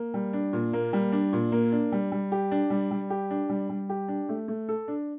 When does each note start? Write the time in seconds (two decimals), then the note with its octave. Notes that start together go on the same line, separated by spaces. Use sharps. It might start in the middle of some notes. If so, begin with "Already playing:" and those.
Already playing: A#3
0.14 G3
0.33 D4
0.53 A#2
0.73 A#3
0.93 G3
1.12 D4
1.33 A#2
1.52 A#3
1.72 D4
1.92 G3
2.12 G3
2.32 G4
2.52 D4
2.70 G3
2.91 G3
3.10 G4
3.31 D4
3.49 G3
3.69 G3
3.89 G4
4.08 D4
4.29 A3
4.48 A3
4.69 A4
4.88 D4